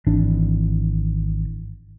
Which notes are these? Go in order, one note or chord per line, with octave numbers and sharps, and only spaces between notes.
G#1 E3 D4